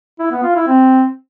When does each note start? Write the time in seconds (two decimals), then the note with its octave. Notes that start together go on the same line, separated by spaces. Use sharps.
0.19 E4
0.31 B3
0.43 F4
0.55 E4
0.67 C4